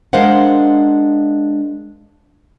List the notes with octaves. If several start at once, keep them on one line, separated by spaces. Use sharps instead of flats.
G#3 D4 A#4 C5 F5 F#5